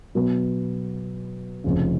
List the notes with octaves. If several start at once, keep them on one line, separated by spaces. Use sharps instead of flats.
B2 F#3 B3
F1 F2 C#3